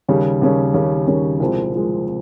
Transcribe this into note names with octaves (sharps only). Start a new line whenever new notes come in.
D#2 C#3 G3 C#4
D#2 C#3 G3 C#4
D#2 C#3 G3 C#4
D#2 C#3 G3 C#4
C2 A#2 F3 G#3 C4
C2 A#2 F3 G#3 C4
C4